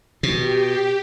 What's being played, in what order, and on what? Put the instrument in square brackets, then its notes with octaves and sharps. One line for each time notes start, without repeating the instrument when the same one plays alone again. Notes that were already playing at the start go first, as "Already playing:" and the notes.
[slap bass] B2 [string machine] G4